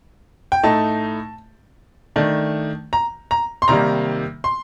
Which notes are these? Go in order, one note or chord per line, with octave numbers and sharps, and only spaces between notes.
G5
A2 A3 D#4 A5
D#3 A3 D4
A#5
A#5
C6
C3 D#3 G3 A#3 D#4 A#5
C6